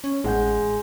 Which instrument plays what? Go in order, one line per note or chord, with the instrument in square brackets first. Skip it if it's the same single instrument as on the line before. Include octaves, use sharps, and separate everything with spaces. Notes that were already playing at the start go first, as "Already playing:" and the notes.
[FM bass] C#4
[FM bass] A1 [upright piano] G#3 F#5 G6